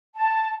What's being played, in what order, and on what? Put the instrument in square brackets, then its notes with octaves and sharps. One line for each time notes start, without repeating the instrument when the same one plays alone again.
[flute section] A5